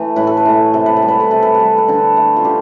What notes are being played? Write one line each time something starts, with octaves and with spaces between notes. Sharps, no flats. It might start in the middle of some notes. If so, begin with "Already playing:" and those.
Already playing: E3 A3
A2 B4
A4
B4
E3 A3
C3 A4
B4
A4
G3
B4
A4
C3 B4
A4
B4
G3
A4
B4
D3 A4
A3
F4
D3 G4